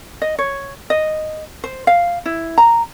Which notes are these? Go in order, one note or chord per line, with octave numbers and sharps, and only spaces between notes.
D#5
C#5
D#5
C5
F5
E4
A#5